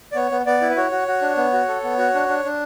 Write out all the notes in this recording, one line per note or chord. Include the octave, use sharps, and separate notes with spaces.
D5
B3 C#5
B3
B3 D5
E4
B4
F#4 C#5
F#4
F#4
D4
B3
F#4
A4
B3
F#4
D4
D4
D4